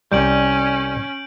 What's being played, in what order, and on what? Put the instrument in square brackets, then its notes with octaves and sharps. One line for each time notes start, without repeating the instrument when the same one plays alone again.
[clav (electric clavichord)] C2 G3 [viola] C#4 [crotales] G6 D7 F#7